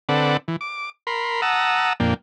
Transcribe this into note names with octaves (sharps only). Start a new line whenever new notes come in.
D3 C4 A4 B4 D5 F#5
E3
D6
A#4 B5 C6
F#5 A5 A#5 D#6 E6
F2 A#2 A#3 D4 G5